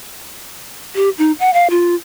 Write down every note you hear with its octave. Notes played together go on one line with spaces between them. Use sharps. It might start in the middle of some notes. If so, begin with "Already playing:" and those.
G4
D#4
F#5
F5
F4